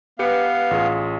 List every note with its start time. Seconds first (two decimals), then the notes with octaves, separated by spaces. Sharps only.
0.19 B3 G4 B4 F5 C#7
0.71 A1 F4 G#4